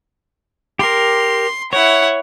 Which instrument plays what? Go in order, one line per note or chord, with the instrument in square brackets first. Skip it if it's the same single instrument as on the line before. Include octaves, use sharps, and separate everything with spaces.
[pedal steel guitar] G4 A#4 [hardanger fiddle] C6
[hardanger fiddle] E4 F#5 [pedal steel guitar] C#5